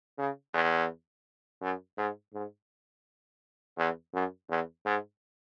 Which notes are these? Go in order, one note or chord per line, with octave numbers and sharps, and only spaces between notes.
C#3
E2
F#2
G#2
G#2
E2
F#2
E2
G#2